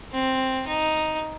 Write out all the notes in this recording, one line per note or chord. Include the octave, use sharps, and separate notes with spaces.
C4
D#4